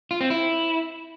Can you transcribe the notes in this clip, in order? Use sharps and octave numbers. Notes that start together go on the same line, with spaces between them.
F4
C4
E4